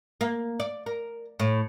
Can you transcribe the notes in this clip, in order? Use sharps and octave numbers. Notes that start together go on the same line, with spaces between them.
A#3
D5
A#4
A2